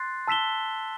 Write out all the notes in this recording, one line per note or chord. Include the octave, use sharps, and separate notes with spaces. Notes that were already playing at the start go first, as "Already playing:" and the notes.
Already playing: C6 F#6 A6 C7
A5 E6 B6 E7 G7